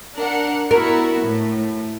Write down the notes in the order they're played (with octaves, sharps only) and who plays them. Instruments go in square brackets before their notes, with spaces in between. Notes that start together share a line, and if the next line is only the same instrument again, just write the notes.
[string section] D4 A#4 F#5
[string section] B3 E4 F#4 [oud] A#4
[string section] A2